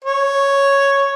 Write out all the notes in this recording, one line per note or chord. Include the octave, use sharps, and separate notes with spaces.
C#5